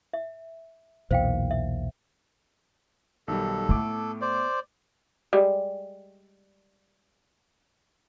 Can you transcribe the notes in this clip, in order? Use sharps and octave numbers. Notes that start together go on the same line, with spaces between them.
E5
B1 E2 A#2 C5 F5 G5
E5
B1 D#3 G3 A4
A2 A3 B3 D6
C5 D5
G3 G#3